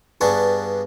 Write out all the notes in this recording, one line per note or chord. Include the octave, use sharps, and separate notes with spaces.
G2 B3 D4 G#4 A5 C#6